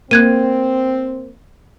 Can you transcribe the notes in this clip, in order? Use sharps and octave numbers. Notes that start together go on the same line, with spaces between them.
A#3 C4 F#6 G#6 D#7